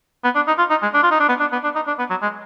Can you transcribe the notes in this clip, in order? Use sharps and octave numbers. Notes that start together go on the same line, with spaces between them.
B3
D4
D#4
F4
D#4
G#3
D4
F4
D#4
D4
B3
D4
B3
D4
D#4
D4
B3
F#3
G#3